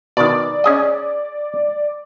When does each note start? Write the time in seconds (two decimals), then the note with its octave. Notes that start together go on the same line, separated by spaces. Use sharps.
0.17 B2 D#3 D5
0.64 C#4 G#4 D#5